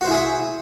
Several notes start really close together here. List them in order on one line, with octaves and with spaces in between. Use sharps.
F#4 C5 E4 G#4 E5